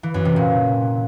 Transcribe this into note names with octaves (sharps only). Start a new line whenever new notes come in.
E3
F#2
C3
A#2